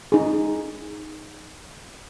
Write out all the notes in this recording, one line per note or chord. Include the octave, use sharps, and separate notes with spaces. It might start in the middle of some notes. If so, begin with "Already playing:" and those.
D#4 G#4